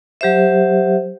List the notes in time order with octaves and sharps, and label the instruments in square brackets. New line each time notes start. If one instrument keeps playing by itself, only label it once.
[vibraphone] F#3 G4 C5 E5